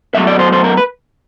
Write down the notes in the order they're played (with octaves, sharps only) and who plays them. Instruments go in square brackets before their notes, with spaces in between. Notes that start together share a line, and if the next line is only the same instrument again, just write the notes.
[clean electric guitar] B1 B2 F#3 A3 E5
D5
C5
C5
A#4
B4